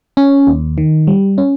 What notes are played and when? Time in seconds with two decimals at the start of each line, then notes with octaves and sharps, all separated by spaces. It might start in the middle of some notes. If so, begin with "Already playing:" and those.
0.17 C#4
0.47 D#2
0.78 D#3
1.07 G3
1.38 C#4